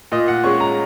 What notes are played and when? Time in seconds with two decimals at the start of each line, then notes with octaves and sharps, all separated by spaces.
0.12 A#2 D#5
0.28 F#5
0.44 G#3 C#4 C#6
0.60 A#5